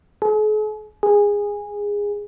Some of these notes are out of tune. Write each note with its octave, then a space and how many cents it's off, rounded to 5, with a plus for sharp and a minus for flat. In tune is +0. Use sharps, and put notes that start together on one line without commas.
G#4 +45
G#4 -20